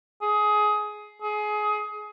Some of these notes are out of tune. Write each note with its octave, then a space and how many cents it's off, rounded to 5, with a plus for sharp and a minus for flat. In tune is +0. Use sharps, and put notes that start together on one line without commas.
G#4 +15
G#4 +20